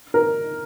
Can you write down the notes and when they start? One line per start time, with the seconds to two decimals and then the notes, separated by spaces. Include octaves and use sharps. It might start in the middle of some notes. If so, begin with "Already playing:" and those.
0.14 A#4